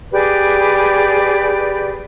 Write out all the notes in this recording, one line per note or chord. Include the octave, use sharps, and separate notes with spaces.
G4 G#4 B4 D5